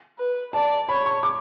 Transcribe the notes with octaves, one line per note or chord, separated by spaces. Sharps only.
B4
D5 A5
C#5 B5
C#6
D6